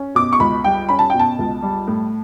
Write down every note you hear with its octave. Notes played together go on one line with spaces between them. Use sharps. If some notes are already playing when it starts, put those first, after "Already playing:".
Already playing: C#4
B2 D6
C#6
C#2 B5
G3 G5
C#4 B5
A5
B2 G5
A5
C#2
G3
A2